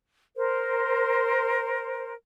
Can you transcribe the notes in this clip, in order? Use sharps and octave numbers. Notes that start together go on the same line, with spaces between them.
A#4 C5